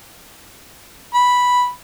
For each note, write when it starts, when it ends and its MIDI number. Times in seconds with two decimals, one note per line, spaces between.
1.14 1.70 83